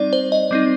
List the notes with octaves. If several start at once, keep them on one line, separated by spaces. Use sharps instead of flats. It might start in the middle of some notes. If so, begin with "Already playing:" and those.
Already playing: G3 C4 D#4 D5
C5
D#5
G3 C4 D#4